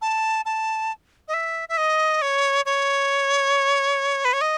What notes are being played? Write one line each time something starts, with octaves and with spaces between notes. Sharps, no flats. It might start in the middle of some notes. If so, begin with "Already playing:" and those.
A5
A5
D#5
E5
E5
D#5
C#5
C#5
B4
C#5
D#5